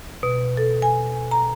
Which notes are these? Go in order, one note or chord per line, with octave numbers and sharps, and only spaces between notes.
B2
A4
G#5
A#5